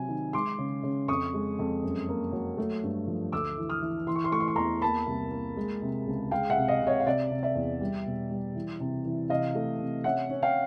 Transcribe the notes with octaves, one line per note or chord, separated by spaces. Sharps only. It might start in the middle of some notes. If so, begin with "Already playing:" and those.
Already playing: C3 F#3 G#5
D#3
G#3 C6 D6
C#3
C#3
F2 C#6 D#6
G#3
F2
F#2
A#3
F#3
A3
G2
F3
D2 D6 E6
E3
D#6 F6
E3
E3 C6
C#6
C6
A3 C#6
C6
C#6
E2 A#5 C6
A#3 A5 B5
C2
A#3
G#3
C3
C#2
G#3 F5 G5
E5 F#5
C3
D#5 F5
C3
C#5 D#5
F5
C3 D5 E5
C3
D5 E5
E2
G3
B2
G3
E3
C3
E3
C3 D#5 F5
A3
C3
C#4 E5 F#5
C#4
F5 G5